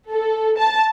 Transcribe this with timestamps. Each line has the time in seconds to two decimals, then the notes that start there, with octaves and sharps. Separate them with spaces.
0.11 A4
0.58 A5